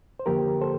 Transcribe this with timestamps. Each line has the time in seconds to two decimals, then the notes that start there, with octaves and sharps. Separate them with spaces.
0.19 C5
0.26 F2 D3 F3 A#3 G4 A#4
0.61 A4 C5